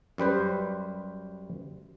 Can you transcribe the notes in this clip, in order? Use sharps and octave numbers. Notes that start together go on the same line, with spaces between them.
F#2 G3 B4 C5